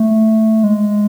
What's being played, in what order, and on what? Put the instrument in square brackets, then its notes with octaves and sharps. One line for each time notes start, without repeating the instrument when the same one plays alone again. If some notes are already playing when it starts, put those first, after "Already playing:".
Already playing: [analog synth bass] A3
G#3